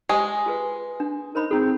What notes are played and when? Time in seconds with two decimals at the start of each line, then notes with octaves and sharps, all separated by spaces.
0.09 G#3 G4 C5 G#5
0.46 F4 G#4 B4
1.00 D4
1.35 D#4 A#4 C5 B5
1.51 C4 D#4 G#4 A4